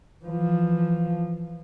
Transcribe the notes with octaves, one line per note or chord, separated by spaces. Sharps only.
E3 F3